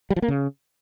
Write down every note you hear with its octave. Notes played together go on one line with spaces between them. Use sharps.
G3
F3
A#3
C#3